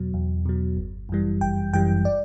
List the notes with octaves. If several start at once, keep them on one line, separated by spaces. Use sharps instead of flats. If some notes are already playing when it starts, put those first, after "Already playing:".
Already playing: E2 B2 F#3
E2
B2 F#3
G1
F#2 E3 G3
G1 G5
F#2 E3 G3 G5
D5